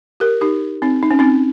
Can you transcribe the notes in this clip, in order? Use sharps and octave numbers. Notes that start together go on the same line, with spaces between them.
G4 A#4
D#4 G4
C4 D#4
D#4
C#4
C4 D#4